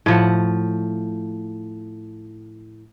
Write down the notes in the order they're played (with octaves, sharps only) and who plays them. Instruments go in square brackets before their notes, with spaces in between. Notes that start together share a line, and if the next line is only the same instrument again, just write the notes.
[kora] A2 F3 F#5